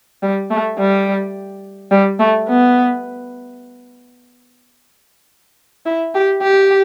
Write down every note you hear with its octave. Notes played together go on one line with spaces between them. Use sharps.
G3
A3
G3
G3
A3
B3
E4
G4
G4